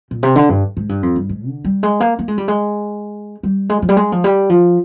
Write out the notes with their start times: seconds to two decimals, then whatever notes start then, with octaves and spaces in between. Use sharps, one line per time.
0.11 A#2
0.23 C3
0.36 D3
0.49 G2
0.77 G#2
0.89 G2
1.03 F2
1.16 G2
1.29 G#2
1.47 D3
1.64 G3
1.83 G#3
2.00 A#3
2.19 A#3
2.28 G#3
2.38 G3
2.48 G#3
3.43 G3
3.69 G#3
3.82 F3
3.89 G3
3.97 G#3
4.12 F3
4.24 G3
4.49 F3